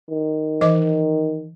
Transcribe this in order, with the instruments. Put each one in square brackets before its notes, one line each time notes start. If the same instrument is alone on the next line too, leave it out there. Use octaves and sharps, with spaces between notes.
[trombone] D#3
[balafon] E3 D#5 D6